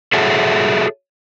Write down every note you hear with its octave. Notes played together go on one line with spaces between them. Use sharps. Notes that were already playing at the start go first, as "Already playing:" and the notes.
F#4 G#4 A4 C#5 E5 F#5